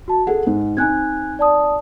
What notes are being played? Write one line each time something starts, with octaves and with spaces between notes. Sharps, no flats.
F#4 A5
G#4 A4 F#5
G#2
C4 D#4 G#5 F#6 G#6
D5 A5 D#6